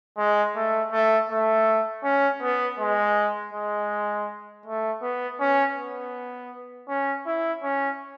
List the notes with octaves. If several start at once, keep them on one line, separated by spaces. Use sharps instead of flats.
G#3
A3
A3
A3
C#4
B3
G#3
G#3
A3
B3
C#4
B3
C#4
E4
C#4